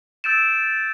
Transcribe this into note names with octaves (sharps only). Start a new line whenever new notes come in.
E6 G6 A6 D7 E7